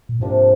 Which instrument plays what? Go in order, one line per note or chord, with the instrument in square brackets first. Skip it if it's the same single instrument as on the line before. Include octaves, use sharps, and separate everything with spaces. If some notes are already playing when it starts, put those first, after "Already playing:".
[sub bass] A#2
[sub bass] G#2 [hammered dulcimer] C3 F3 A#3 D4